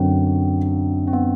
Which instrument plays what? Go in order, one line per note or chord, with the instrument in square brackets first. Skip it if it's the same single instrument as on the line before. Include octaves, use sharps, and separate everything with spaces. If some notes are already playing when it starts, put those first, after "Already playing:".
Already playing: [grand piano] F#2 D3 F#3 [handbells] C4
[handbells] C4
B3